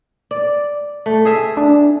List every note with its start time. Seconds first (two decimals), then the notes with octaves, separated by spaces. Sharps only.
0.31 D5
1.06 A3
1.25 G#4 E5
1.57 D4